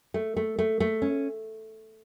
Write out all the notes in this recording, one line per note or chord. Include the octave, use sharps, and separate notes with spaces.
A3
A3
A3
A3
C#4